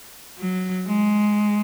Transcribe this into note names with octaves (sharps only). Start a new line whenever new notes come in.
F#3
G#3